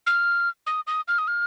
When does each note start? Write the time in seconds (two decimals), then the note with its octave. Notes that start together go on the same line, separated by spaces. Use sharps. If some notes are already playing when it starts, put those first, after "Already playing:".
0.07 F6
0.67 D#6
0.87 D#6
1.08 F6
1.18 D#6
1.28 F6